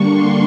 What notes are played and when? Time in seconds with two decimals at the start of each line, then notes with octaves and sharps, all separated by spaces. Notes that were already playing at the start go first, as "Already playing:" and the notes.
Already playing: D3 G3 A#3 D4 C#6
0.10 C6